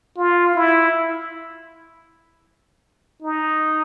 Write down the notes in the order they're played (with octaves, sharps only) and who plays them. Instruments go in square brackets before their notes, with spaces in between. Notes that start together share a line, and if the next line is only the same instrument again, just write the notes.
[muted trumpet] F4
E4
D#4